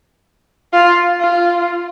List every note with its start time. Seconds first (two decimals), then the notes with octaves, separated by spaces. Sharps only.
0.73 F4
1.21 F4